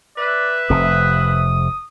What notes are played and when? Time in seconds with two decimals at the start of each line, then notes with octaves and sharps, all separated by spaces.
0.17 B4 D5 E5
0.70 F1 C3 D#6